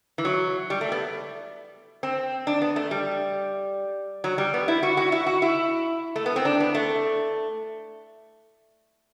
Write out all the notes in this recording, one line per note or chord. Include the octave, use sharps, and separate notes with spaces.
E3
F#3
G3
A3
B3
C4
D4
B3
A3
G3
F#3
G3
B3
E4
F#4
F#4
E4
F#4
E4
A3
B3
C4
D4
B3
A3